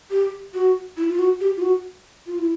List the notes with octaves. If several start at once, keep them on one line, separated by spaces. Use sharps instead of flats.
G4
F#4
E4
F4
F#4
G4
F4
F#4
F4
E4